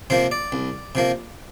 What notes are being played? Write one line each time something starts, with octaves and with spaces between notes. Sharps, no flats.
C3 F3 A#3 C5
D5
C2
C3 F3 A#3